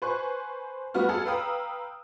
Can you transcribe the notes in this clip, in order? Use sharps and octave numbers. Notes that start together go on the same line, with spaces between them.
B4 C5 G#5 C#6 F#6
G3 B3 F#4 F6
G#4 A4
B4 F5 G5 A#5 D#6 E6